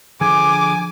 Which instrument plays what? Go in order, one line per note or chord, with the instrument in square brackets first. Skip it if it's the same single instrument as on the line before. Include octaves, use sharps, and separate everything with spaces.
[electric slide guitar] D3 F3 G#4 [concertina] G#5 [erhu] D6